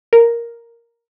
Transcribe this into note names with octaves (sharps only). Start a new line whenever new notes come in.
A#4